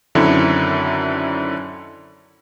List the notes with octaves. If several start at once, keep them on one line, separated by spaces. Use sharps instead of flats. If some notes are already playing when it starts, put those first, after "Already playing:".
F#2 D3 D#3 C4 E4